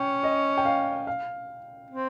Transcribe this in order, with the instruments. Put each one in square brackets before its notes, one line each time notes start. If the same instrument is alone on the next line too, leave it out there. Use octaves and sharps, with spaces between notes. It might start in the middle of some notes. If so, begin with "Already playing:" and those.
Already playing: [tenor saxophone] C#4 [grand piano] G5
[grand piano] D#5
G5
F5
F5
[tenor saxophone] C4